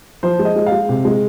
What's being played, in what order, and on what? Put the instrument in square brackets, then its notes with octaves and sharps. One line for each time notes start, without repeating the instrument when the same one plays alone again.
[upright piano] F3 C5
G#3
D#5
G#3
F5
G#3
C3
G#3